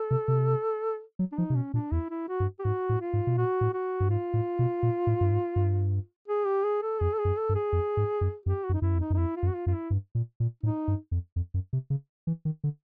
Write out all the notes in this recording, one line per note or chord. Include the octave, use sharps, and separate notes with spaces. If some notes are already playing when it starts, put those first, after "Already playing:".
Already playing: A4
C3
C3
F#3
D4
F3 D#4
C3
B2 C#4
A#2 D4
E2 E4
E4
F#4
G2
G4
G#2 F#4
A2
F4
G#2
B2
A#2 F#4
A2
F#4
G2
G#2 F4
A2
B2
A#2
A2
G2
G#2
G2
G#4
G4
G#4
A4
F2 G#4
A4
G#4
F#2
A4
G2
G#4
F2
G#2
F#2
F#2 G4
F#4
F#2
D#4
F#2 E4
F2
D#4
F#2
D#4
F2 E4
F4
F#2
F#4
F4
F#2 F4
E4
G2
A#2
A#2
A2 D#4
G2
F2
F2
F#2
C3
C#3
E3
D#3
D3